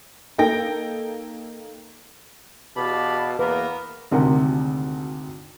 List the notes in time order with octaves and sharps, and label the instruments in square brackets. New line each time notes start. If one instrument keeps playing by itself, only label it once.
[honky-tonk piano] A#3 D#4 A4 G5 A#6
[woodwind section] E2 F5 A5 [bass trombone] B2 [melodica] G4 B5
[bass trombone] E2 [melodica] A#3 [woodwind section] B3 A#4 [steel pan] B4
[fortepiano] G#1 D2 C3 A#4